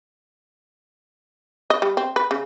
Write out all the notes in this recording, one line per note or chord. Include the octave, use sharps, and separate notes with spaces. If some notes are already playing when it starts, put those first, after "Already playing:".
D#5
G3
C4
B4
C#3